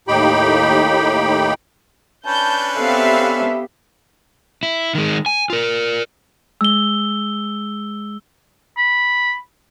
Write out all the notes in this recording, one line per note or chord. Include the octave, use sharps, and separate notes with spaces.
D#2 A2 D#4 G4 G5 B5
C#4 D4 B4 A5 G6
B3 C4 G4 A4 E5 F5
E4
D#3 G#3
G#5
F4 A#4
G#3 E6 G7
B5